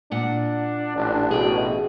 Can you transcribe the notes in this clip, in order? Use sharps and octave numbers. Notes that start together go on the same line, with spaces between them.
A#2 D4 F#5
A1 D4
B2 G#4 G5